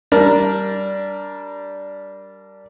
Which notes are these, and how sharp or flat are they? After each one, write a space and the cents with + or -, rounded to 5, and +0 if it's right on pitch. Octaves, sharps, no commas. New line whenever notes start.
G3 -15 D4 -10 A#4 +0